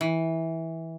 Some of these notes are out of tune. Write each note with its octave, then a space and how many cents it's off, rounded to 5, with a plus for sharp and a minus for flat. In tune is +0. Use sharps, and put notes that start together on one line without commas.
E3 -15